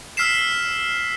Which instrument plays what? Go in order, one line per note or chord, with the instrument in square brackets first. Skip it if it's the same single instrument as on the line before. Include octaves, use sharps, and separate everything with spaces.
[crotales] E6 F6 B6 C7 E7